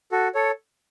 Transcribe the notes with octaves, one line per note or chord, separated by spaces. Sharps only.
F#4 A4
A4 C#5